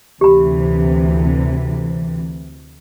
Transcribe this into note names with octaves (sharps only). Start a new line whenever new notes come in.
D2 C3 E3 G4 B5